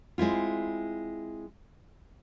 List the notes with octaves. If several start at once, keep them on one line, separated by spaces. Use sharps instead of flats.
G#3 C4 E4 F4